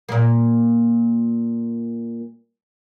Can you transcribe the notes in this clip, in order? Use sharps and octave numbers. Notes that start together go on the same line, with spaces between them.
A#2 A#3